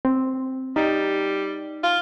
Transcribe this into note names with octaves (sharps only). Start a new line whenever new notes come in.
C4
G3 D#4
F4